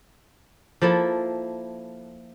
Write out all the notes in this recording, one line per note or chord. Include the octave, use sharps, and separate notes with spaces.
F3 A#3 E4 A4